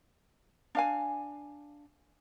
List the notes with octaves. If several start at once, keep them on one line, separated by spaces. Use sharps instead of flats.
D4 F5 G#5